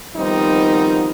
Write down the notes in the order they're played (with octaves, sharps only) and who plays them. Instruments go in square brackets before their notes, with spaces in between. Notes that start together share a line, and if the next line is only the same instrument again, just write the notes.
[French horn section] D#3 F3 G3 B3 C4 D#4